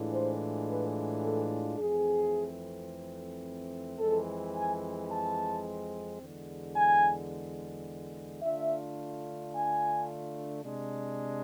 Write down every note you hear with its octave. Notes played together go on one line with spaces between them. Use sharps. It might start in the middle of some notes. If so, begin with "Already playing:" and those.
Already playing: A2 E3 G#3 D4 F4
C5
B4
A4
F2 E3 A3 C4 G#4
F2 E3 G#3 C4 A4
G#5
A5
E2 D3 G#3
G#5
D3 A3 D4 F4 E5
G#5
C3 G#3 D4